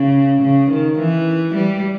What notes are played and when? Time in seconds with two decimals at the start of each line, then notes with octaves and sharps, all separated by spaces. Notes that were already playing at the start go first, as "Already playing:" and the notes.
Already playing: C#3
0.42 C#3
0.70 D#3
0.99 E3
1.55 G3